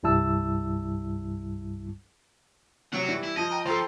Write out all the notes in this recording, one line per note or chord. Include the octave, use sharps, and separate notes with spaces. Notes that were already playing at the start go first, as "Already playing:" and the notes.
C2 G2 G3 E4 A5 E6
C3 F#3 C#5 F#5
E3 G3
E4
F3 D#5
G5 A#5
F3 F4 A4 C5